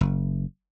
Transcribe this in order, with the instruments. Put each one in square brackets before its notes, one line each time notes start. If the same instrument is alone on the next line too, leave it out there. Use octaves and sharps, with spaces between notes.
[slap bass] F#1